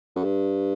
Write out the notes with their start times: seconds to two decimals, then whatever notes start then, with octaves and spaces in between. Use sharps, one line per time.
0.16 F#2
0.24 G2